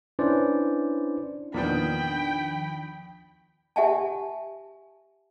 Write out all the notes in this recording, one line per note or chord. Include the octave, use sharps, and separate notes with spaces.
C#4 D4 E4 B4 C5 D5
E2 A#2 D#3 F3 B3 D4 G5 B5
G4 E5 F#5 G#5 A5